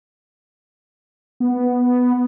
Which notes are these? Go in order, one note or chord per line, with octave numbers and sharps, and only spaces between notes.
B3